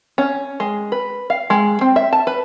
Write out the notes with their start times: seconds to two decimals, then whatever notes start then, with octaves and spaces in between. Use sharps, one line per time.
0.18 C#4
0.60 G#3
0.92 B4
1.30 F5
1.50 G#3
1.81 C4
1.96 E5
2.13 A5
2.27 B4